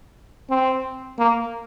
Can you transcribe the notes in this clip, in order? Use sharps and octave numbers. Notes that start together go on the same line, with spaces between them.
C4
A#3